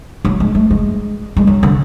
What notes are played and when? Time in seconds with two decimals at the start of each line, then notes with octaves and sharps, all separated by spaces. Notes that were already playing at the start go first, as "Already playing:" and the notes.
0.25 F#3
0.40 G#3
0.55 A3
0.71 G#3
1.37 G#3
1.47 F#3
1.63 D3